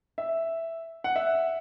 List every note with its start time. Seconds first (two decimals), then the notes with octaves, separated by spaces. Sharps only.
0.18 E5
1.04 F#5
1.16 E5